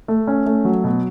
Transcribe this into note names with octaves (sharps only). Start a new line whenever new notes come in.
A3
C#4
A3
F#3
B2